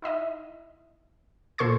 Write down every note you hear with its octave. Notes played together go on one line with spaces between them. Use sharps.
D#4 E4 D#5 E5
A#2 A4 C5 C6 C#6 G#6